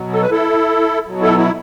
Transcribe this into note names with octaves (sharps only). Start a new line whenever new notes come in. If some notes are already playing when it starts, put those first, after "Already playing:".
Already playing: B2 F#3
A4
B4
E4 A4
B2 F#3
E4 A4
E4